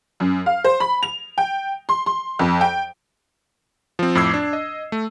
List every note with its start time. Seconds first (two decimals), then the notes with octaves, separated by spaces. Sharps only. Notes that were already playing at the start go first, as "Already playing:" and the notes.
0.20 F#2
0.46 F5
0.64 C5
0.80 B5
1.03 F7
1.38 G5
1.89 C6
2.06 C6
2.39 F2
2.61 G5
3.99 F3 C4
4.15 F2 A2 D6 E6 G#6 C7
4.34 D4
4.53 D#5
4.92 A3